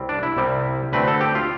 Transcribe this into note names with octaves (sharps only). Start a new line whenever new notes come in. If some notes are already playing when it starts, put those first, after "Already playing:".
Already playing: C2 G3 C4
D4
E4
C2 C3 G3 C4
D2 D3 A3 C4 B4
A4
G4
F4